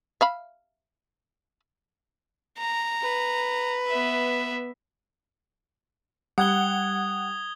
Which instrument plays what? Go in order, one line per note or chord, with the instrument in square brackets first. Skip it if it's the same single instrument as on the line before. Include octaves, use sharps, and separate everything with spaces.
[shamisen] E5 F5 B5
[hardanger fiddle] A#5
[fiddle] B4
[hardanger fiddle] B3 E5
[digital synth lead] G3 [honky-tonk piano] F#5 [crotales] D#6 G#6 G7